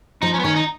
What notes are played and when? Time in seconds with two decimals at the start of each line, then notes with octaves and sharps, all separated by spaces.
0.22 F3 D#4
0.34 C#4
0.40 B3
0.44 D#3 C#4
0.56 D#4